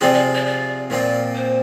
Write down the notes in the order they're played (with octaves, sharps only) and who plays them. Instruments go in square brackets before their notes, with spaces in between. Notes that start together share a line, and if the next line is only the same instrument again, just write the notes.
[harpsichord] C3 F3 C4 F4 G#4 [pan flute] D5
[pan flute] D5
D5
D5
[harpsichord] A#2 F3 C4 [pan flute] D5
[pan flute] C5